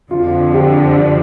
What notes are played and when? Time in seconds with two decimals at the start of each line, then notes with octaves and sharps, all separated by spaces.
0.11 F2 D3 F3 F4
0.54 G4
0.98 D5